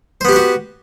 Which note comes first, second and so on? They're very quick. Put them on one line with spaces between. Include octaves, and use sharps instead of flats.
C5 B3 G4 B4 F#4